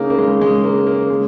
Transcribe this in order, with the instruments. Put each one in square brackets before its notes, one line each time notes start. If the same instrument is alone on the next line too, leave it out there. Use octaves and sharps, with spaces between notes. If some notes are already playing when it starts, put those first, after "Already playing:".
Already playing: [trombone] C#3 [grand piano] A#3 D#4
[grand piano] A#3
G#3
G#3
A#3
A#3
G#3